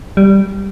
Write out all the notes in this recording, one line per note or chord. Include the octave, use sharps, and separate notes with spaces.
G3